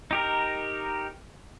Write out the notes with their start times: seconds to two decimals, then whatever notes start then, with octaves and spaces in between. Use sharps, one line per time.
0.11 D#4 G4 A#4